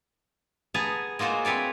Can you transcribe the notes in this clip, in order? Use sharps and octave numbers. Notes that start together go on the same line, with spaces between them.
B3 G#4 A5 A#5
G#3 A#3 F4 F#4 C5
C4 B4 C#5 D5